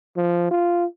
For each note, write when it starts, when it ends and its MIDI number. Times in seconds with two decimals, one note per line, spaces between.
0.17 0.47 53
0.51 0.85 65